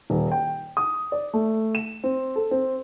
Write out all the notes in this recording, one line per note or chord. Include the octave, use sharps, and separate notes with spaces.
D#1
G5
D#6
D5
A3
E7
C4
A4
C4